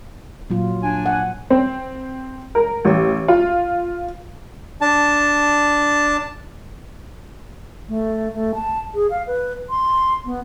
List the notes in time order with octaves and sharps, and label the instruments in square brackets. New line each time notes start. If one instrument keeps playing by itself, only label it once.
[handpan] A#2 F#3 F4
[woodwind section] D4 G#5
[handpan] F#5
[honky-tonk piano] C4
A#4
A1
F4
[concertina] D4 A5
[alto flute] A3
A3
A5
G#4
F5
B4
C6
B3